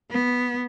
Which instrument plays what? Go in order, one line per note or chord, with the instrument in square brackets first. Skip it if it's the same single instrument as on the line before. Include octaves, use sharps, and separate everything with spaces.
[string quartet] B3